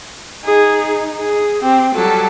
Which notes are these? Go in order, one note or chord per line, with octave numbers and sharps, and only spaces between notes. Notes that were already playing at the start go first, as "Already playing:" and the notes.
D#4 G#4
G#4
C4 G4
F#3 G3 A4